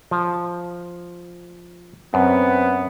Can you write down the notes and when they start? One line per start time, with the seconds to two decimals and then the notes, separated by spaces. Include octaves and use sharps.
0.11 F3
2.14 F#2 B3 C4